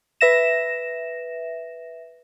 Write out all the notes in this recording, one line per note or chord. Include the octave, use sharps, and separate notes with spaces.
B4 E5 A#6 E7